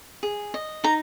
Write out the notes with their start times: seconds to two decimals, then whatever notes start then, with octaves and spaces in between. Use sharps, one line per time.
0.23 G#4
0.54 D#5
0.84 D#4 A#5